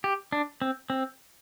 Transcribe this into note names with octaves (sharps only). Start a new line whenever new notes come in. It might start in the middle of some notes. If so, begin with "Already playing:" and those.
G4
D4
C4
C4